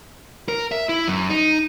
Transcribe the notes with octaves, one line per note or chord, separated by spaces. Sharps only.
A#4
E5
E4
F#2
D#4